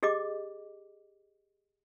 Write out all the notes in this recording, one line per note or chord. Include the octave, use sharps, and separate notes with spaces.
G4 G#4 D#5 D6